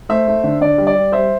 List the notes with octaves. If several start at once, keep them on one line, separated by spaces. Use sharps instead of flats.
A3 C5 E5
A3
D3
D3 D5
G3
D5
G3
G3 C5 E5